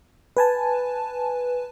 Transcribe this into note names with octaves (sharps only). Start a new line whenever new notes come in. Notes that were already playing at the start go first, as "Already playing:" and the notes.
B4 G#5 A5